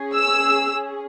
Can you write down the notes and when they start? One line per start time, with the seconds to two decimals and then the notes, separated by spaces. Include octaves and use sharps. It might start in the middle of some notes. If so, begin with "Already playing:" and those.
Already playing: C#4 G#4
0.15 E6